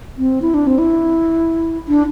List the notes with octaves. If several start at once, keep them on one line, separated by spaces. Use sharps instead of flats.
C4
E4
D4
C4
E4
D4